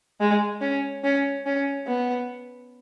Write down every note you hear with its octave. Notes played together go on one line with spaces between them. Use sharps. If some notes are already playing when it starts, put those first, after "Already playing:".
G#3
C#4
C#4
C#4
B3